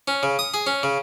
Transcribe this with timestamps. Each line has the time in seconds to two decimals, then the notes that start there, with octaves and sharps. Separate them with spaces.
0.08 C#4
0.23 C#3
0.39 D#6
0.54 G#4
0.67 C#4
0.83 C#3